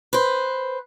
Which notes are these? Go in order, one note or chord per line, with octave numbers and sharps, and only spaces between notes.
B4 C5